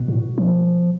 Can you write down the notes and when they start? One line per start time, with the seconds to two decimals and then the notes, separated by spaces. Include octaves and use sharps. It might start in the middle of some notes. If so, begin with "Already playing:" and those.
Already playing: B2
0.08 A2
0.38 F3